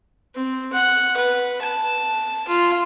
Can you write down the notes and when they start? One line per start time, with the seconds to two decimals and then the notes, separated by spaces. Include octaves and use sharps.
0.35 C4
0.72 F#5
1.16 B4
1.61 A5
2.48 F4